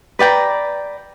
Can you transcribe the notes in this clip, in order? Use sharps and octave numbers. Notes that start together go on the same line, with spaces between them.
B4 D5 G5 A#5